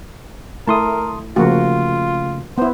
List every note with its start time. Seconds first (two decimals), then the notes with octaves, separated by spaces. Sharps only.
0.68 A3 E4 A#4 A5 C6 D#6
1.36 C#3 F3 A3 A#3 F4 F#4
2.58 B3 E4 C5